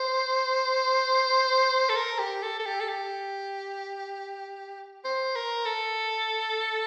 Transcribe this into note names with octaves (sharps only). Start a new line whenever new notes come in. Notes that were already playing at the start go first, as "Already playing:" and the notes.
Already playing: C5
A4
A#4
G4
A4
A4
G4
A4
G4
C5
A#4
A4